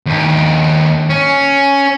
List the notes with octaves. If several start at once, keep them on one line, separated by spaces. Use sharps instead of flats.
D#2 D4
C#4